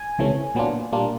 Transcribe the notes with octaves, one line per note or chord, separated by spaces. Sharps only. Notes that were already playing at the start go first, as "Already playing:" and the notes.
Already playing: G#5
C#2 C3 E3 A3 C#4
A#2 F#3 B3 D4 F4
A#2 G3 A#3 D4 F4